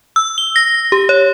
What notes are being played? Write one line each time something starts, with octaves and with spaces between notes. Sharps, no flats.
E6
G7
A#6
G4
C#5